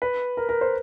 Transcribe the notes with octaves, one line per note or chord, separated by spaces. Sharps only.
B4
A#4
A#4
C5